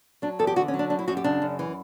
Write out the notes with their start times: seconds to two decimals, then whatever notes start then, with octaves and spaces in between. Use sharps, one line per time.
0.22 F#3 D4
0.39 E2 A4
0.47 G4
0.56 D3 F#4
0.68 C#4
0.74 F#3
0.79 D4
0.90 F#2 D4
0.99 E4
1.08 F#2 F#4
1.17 G4
1.24 C#3 D4
1.42 F#2
1.59 E3